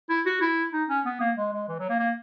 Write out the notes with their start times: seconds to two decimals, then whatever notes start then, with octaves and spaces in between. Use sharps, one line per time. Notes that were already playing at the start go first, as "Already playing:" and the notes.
0.10 E4
0.26 F#4
0.41 E4
0.73 D#4
0.89 C#4
1.05 B3
1.20 A#3
1.37 G#3
1.53 G#3
1.68 E3
1.79 F#3
1.89 A#3
2.00 A#3